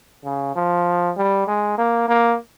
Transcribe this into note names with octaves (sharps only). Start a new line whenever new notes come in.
C#3
F3
G3
G#3
A#3
A#3